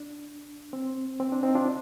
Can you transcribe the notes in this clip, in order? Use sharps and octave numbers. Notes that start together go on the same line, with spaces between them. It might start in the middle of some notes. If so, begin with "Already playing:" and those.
Already playing: D4
C4
C4
D4
C4 D#4
D4 F4